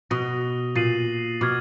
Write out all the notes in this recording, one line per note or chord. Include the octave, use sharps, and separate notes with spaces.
B2 D#6 F#6 A#6 D#7 G7
A#2 A6 C7 D#7 F#7
B2 D6 F6 G#6